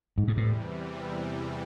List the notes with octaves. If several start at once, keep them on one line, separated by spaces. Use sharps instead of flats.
E2 G#2 C3 E3 G3
G#2
A2